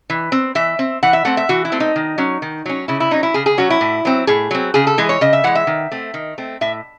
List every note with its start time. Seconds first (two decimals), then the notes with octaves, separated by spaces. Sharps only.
0.10 E3
0.32 C4
0.55 E3 E5
0.79 C4
1.03 E3 F#5
1.13 E5
1.25 A3 C4 F#5
1.37 E5
1.49 E3 F#4
1.65 E4
1.72 A3 C4
1.80 D#4
1.96 D#3
2.18 F#3 C#4
2.42 D#3
2.66 F#3 C#4
2.88 C#3 E4
3.00 E4
3.11 F#3 C#4 D#4
3.23 E4
3.34 C#3 G#4
3.46 G#4
3.58 F#3 C#4 F#4
3.70 E4
3.81 A2
4.05 F#3 C4
4.27 A2 G#4
4.51 F#3 C4
4.74 C#3 G#4
4.87 A4
4.98 E3 G#3 G#4
5.09 C#5
5.21 C#3 D#5
5.33 E5
5.44 E3 G#3 F#5
5.55 E5
5.67 D#3
5.92 A3 C4
6.14 D#3
6.38 A3 C4
6.61 A2 E5